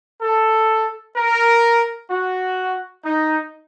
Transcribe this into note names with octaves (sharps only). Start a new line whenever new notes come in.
A4
A#4
F#4
D#4